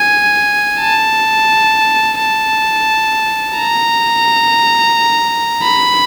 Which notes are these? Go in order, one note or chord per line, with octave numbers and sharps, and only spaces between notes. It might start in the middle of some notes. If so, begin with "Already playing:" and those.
Already playing: G#5
A5
A5
A#5
B5